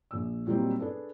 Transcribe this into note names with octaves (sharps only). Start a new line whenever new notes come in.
A#1 E6
A#2 F#3 G3 C4 D#4
B3 D4 G#4 A4